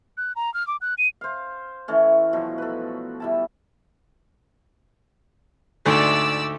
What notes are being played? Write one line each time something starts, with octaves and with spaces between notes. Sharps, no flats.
F#6
A#5
F6
D6
F#6
D#7
C5 F5
E3 A3 C#4
B2 F3 F#3
A4 B4
G3 E4 A5
D2 G#2 A3 D5 E6